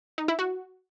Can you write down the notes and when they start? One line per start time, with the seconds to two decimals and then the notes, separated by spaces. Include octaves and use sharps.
0.18 D#4
0.28 E4
0.39 F#4